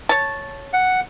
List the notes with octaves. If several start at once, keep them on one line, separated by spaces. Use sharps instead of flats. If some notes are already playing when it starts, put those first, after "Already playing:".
C#5 A5
F#5